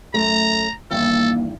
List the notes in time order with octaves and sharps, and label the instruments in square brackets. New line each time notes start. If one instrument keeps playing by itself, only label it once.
[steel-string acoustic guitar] F#2 A3 [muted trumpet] A#5
[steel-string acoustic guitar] E2 G2 D#3 [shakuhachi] A#3 [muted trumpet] A4